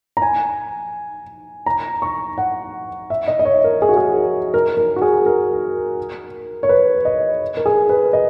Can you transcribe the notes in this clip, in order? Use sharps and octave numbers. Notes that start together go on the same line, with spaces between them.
A#5
G#5
A#5
C#6
F#5
E5
D#5
D#5
C#5
A#4
G#4
F#4
G#4
A#4
A#4
F#4
G#4
A#4
C#5
B4
D#5
A#4
G#4
B4
D#5